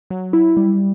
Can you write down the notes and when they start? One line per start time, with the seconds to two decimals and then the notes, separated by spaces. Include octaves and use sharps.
0.10 F#3
0.33 E4
0.57 G3